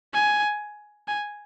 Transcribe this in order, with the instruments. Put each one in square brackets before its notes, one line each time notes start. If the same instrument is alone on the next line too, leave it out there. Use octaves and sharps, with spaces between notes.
[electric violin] G#5
G#5